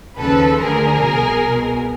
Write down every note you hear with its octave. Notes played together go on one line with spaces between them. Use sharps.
D#2 C#3 F3 A4 B4
D2 D3 F3 G#4 A#4
C2 B2
C2 B2